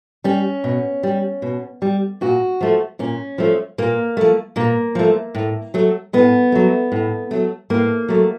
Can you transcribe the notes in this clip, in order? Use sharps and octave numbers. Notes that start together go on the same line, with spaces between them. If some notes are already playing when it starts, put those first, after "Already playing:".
G3 C#4
B2
G3
B2
G3
A#2 F#4
F3 A3
A#2 C#4
F3 A3
A#2 A#3
F3 A3
A#2 A#3
F3 A3
A2
F#3 A3
A2 B3
F#3 A3
A2
F#3 A3
A2 A#3
F#3 A3